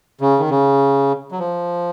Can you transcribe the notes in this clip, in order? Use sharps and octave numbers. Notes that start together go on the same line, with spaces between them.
C#3
D#3
C#3
F#3
F3